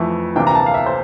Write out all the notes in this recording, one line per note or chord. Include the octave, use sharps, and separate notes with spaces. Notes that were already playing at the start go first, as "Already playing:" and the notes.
Already playing: F2 E3 A3
D2 C3 E3 A#3 D4 G5
A#5
A5
F5
E5
C5